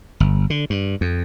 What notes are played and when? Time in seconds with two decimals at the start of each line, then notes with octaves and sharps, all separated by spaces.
0.20 G1
0.50 D3
0.70 G2
1.01 F2